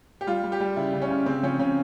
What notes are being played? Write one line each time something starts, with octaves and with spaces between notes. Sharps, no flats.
G4
G3 F4
G3
G4
G3
C#3 E4
C#3
C#4
C#3
C#3 C4
F3 C#4
C#3 C#4